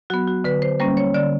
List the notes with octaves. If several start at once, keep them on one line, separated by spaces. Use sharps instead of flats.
F#3 B3 F#4
F#4
D3 B4
C5
G3 A#3 C#4 C5
C#5
D3 D5